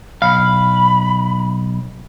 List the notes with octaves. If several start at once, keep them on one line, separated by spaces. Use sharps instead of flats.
B1 F5 B5